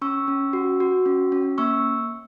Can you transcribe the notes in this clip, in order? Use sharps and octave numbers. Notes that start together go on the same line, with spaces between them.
C#4 C#6 E6
C#4
F#4
F#4
C#4
C#4
A#3 C#6 E6